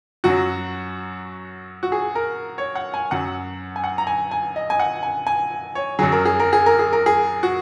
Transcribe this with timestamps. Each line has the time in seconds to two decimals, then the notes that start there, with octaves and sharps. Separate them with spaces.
0.24 F#2 F#3 F#4
1.83 F#4
1.92 G#4
2.15 A#4
2.58 C#5
2.75 F#5
2.94 G#5
3.11 F#2 F#3 F#5
3.76 G#5
3.84 F#5
3.98 A#5
4.07 G#5
4.31 G#5
4.56 D#5
4.70 G#5
4.79 F#5
5.03 G#5
5.27 G#5
5.75 C#5
5.99 F#2 F#3 G#4
6.12 A#4
6.25 G#4
6.40 A#4
6.53 G#4
6.66 A#4
6.79 G#4
6.93 A#4
7.06 G#4
7.43 F#4